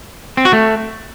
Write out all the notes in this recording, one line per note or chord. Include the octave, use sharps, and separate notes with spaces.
C4
F#4
A3